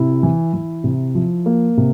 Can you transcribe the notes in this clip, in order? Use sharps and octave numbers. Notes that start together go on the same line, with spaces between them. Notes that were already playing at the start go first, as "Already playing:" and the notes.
Already playing: C3 E4
E3
E3
C3
F3
A#3
C3